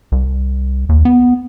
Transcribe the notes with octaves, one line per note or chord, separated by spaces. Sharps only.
C2
D#2
B3